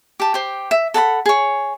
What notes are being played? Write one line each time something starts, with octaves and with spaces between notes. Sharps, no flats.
G4 A5
G4 C5
E5
A4 F#5 A5 B5
G#4 C#5